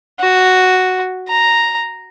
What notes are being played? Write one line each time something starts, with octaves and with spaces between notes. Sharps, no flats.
F#4
A#5